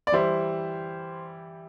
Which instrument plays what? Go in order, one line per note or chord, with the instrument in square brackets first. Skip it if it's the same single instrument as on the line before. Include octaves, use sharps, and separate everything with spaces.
[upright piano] D5
[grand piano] E3 G3 E4 [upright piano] C5